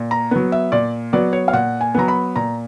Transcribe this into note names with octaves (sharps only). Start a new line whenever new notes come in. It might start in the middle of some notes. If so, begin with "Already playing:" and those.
Already playing: A#2
A#5
F#3 B3
E5
A#2 D5
F#3 B3 D5
C#5
F5
A#2 F#5
G#5
F#3 B3 A#5
B5
A#2 A#5